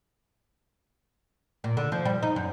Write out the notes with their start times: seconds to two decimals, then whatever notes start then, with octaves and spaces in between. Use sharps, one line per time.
1.64 A#2
1.77 D3
1.92 F3
2.05 G3
2.23 D#4
2.36 F#2